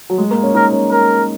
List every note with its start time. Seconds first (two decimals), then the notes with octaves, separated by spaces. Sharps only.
0.10 F#3
0.18 G#3
0.31 A#3
0.43 C#4
0.54 D#4 A#4
0.73 C#4
0.91 A#4